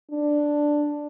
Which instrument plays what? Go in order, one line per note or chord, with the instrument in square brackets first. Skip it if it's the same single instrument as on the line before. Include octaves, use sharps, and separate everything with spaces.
[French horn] D4